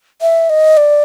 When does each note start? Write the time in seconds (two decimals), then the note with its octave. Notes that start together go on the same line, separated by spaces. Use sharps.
0.22 E5
0.50 D#5
0.77 D5